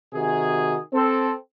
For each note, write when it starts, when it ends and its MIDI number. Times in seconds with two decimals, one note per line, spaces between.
0.13 0.77 48
0.13 0.77 51
0.13 0.77 66
0.13 0.77 68
0.93 1.30 60
0.93 1.30 69